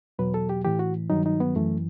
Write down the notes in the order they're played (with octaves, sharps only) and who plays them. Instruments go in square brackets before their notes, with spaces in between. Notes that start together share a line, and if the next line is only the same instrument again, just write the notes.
[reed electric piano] E2 B2 F#3 B4
A4
G4
A2 E3 G4
F#4
G2 D#3 F#3 D#4
D#4
B3
F#2 E3 A3